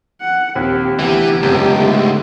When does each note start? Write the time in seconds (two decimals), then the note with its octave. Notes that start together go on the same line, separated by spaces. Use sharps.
0.21 F#5
0.55 A#1 D#2 C4 G4
0.99 D2 C3 E3 B3 G4
1.42 E1 C#2 F#2
1.79 G#2 D3 A3